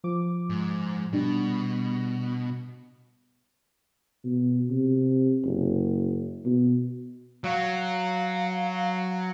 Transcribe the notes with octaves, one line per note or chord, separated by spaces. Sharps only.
F3 D6
G#2
B2 G3 D4
B2
C3
F#1
B2
F#3 F5